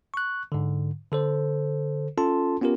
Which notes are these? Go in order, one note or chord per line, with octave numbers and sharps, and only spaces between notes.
C#6 F#6
G#2 D3
D3 A4 C5
C#4 F4 A4 A5 C6
B3 C#4 F4 G4 A#4